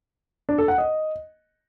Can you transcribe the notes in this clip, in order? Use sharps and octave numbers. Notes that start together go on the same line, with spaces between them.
D4
A4
F#5
D#5